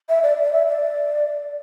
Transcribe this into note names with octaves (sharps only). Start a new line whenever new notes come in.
E5
D5
D5
E5
D5